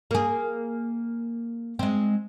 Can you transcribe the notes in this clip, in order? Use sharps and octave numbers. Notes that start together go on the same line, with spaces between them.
A#3 G#4
G#3 C4